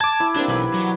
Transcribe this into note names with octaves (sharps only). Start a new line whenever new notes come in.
A5 D6 G#6
E4
G3 A#3 C4 D4
B1 E3 B4
F#3